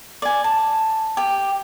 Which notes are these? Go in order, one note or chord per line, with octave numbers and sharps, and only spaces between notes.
D5 G#5
A5
G4